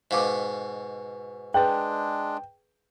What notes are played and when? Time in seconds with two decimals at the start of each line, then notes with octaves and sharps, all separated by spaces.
0.11 G#2 B2 F5 D6
1.54 G#3 D4 G#4 B4 G5